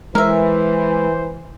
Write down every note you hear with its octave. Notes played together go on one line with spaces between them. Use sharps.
E3 G#3 A#4 C5 E5